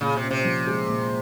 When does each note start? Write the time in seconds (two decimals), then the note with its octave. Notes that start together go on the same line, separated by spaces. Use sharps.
0.01 A#2 C#3
0.16 C3
0.23 C#4
0.31 C3
0.45 F3
0.67 G#3
0.89 A#2